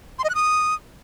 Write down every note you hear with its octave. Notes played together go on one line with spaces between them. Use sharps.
C6
D#5
F#6
D#6